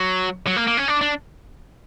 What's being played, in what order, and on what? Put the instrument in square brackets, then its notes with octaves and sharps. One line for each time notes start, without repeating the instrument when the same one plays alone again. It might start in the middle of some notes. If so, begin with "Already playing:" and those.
Already playing: [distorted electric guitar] F#3
F#3
A#3
A#3
C#4
D4
D4